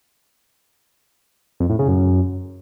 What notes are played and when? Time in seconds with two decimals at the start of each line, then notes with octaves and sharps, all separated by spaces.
1.60 F2
1.70 A2
1.79 C#3
1.89 F#2